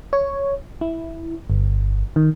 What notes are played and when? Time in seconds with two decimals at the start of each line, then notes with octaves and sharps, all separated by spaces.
0.13 C#5
0.81 E4
1.50 G1
2.16 D#3